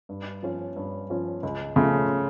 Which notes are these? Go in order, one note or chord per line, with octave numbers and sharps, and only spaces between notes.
G2
F3 C#4
G2
F3 C#4
C#2
C#3 F3 A3